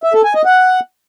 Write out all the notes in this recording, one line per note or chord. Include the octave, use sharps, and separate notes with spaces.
E5
A4
G#5
D#5
F#5